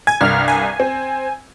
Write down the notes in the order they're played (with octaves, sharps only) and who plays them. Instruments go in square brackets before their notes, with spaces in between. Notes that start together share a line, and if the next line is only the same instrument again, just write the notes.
[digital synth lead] G#5 [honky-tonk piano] G#6
[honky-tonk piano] C2 G2 [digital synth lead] F6
[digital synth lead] G#5
[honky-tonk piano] C4